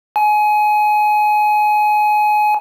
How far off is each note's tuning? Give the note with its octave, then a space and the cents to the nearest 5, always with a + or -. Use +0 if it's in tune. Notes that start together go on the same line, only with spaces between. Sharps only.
G#5 +25